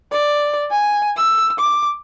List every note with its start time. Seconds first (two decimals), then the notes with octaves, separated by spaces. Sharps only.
0.12 D5
0.71 G#5
1.17 E6
1.59 D6